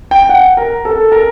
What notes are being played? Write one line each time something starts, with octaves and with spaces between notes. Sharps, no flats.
G5
F#5
A#4
A4
A#4